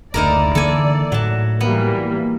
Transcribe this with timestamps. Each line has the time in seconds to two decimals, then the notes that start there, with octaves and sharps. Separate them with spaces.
0.14 F#1 D2 D#4 E4 A#4 D5
0.55 D3 E3 A#3 A4 G#5
1.12 A2 F#3 A5
1.61 E3 G3 A#3 B3